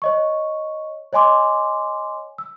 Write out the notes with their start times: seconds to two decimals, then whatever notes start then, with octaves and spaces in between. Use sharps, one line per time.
0.02 C#5 D#5 C#6
1.13 C#5 D#5 G#5 C6 D6
2.38 E6